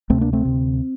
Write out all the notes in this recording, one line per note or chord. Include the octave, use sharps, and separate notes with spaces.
D2 C3 A3 C4
A#3 D4
A3 C4
D2 C3